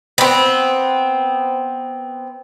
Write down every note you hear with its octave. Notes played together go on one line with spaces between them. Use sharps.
B3 C4